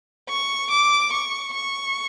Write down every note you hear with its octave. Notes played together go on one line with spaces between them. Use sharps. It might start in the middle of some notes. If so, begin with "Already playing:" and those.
C#6
D6
C#6
C#6